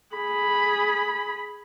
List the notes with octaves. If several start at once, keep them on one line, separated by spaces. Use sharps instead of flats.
G#4 B5